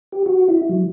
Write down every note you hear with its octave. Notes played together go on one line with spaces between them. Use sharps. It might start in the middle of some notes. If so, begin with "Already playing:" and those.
G4
F#4
E4
F#3